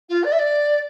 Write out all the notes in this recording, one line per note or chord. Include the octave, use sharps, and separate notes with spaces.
F4
D5
E5
D5